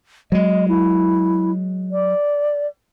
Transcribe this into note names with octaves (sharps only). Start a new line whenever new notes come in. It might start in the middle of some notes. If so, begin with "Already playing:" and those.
F#3 G#3 D#5
E4
D5